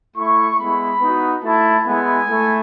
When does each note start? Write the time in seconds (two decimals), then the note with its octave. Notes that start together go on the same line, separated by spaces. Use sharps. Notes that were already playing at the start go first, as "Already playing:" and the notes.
0.17 A3 E4 C#6
0.58 G#3 B3 E4 B5
1.01 B3 D#4 F#4
1.43 A3 E4 A5
1.86 G#3 B3 E4 G#5
2.29 A3 E4